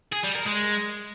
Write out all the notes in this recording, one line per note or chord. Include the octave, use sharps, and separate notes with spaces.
G#4
G3
A#4
G#3